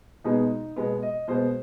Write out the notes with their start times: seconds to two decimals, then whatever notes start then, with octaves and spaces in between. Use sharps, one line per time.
0.24 B2 G#3 B3 D#4
0.76 B2 G#3 B3
1.02 D#5
1.28 B2 G#3 B3 C5